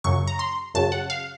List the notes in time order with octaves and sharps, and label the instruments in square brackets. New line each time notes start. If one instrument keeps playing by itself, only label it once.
[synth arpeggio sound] F#2 C#3 F#3 C#6
A#5
C6
F#2 C#3 F#3 A5
F#5
F5